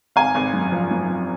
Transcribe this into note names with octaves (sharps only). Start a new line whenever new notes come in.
G#1 F5 G#5
G#1
F#2
F3
F#2
F3